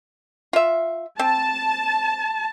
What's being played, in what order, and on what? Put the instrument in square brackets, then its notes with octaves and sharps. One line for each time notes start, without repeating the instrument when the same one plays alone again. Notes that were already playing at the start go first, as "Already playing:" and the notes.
[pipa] F4 E5
[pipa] C4 [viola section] A5